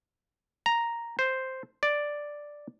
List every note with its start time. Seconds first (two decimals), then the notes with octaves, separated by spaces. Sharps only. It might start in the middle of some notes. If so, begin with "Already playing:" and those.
0.66 A#5
1.19 C5
1.83 D5